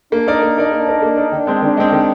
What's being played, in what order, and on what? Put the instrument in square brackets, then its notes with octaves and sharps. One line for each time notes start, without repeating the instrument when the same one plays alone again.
[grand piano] A#3 [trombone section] D4
[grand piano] D#4 A#4 D5
A#3
D#4 A#4 D5
[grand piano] A#3 [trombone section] D4
[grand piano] D#4 A#4 D5
A#3
D#4 A#4 D5
[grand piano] D#3 [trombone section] D4
[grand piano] G#3 C4
[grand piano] D#3 [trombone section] D4
[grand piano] G#3 C4
D#3